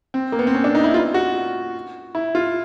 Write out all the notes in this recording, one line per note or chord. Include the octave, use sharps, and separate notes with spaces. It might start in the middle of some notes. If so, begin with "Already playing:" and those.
C4
A#3
B3
C4
C#4
D4
D#4
E4
F4
F#4
E4
F4